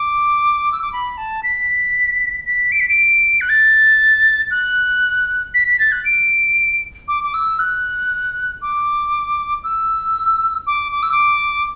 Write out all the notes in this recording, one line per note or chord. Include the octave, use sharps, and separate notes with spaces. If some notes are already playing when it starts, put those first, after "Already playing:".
Already playing: D6
E6
D6
B5
A5
B6
B6
D7
B6
D7
F#6
A6
F#6
B6
B6
A6
F#6
D7
D6
D6
E6
F#6
D6
E6
D6
D6
E6
D6